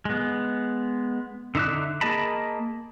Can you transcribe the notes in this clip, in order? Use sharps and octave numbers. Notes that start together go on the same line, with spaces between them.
G#3 B3
D3 D#4 E5 D6 F#6
A#3 G#4 D#5 A5 B5